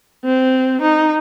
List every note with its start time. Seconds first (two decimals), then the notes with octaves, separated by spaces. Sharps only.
0.25 C4
0.81 D#4